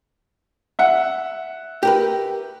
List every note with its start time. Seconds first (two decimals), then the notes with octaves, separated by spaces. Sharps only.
0.79 E5 F#5
1.83 G4 A#4 B4